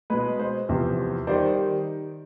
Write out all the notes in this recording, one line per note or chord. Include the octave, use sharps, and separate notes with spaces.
B2 G#3 B4
C5
E2 C3 F3
D#3 G3 C5 D5